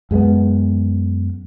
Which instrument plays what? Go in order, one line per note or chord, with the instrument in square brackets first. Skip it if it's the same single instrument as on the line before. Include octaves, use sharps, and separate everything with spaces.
[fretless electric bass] F#2 G#3 A3 B3